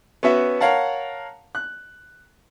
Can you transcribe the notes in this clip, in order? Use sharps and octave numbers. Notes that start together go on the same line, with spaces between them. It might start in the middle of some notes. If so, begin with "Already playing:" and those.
B3 C#4 F#4 E5
A#4 C#5 F5 F#5 A5
F#6